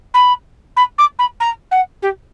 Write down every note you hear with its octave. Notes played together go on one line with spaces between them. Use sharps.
B5
B5
D6
B5
A#5
F#5
G4